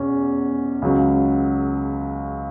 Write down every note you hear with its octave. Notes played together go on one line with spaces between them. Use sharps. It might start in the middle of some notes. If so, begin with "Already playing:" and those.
Already playing: E2 B2 C#4
C#2 C#3 F#3